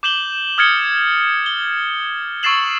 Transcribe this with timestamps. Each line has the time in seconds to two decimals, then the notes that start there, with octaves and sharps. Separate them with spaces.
0.03 D6 G6 E7 F#7 G7
0.58 D#6 F6 G#6 A6 C#7 G7
1.46 G7
2.43 C#6 E6 A6 C7 E7 F#7